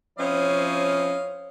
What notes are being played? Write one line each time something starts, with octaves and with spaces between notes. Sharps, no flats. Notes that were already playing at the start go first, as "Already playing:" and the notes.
F3 C4 C#4 E4 C#5 D#5 F5